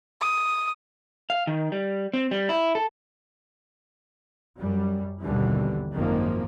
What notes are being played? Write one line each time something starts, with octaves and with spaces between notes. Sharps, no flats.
D#6
F5
D#3
G3
C4
G3
E4
A4
F#2 G3
G#1 D#2 B2 D3 E3 G3
G#1 F#2 D#3 F3 A#3